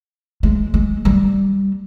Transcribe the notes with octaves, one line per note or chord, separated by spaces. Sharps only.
G#3
G#3
G3